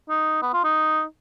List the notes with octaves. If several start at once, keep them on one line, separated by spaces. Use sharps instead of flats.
D#4
B3
F4
D#4